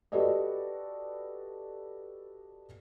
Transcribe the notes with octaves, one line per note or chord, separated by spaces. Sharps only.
F#4 G4 A4 B4 D5 D#5